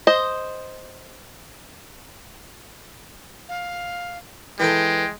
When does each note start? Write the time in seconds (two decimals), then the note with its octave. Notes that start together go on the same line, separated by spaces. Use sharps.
0.07 C5 D#5
3.49 F5
4.60 E3 G#3 A4 G5